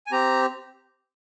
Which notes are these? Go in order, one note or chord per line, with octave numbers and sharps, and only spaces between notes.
G#5
C4 G4 A#5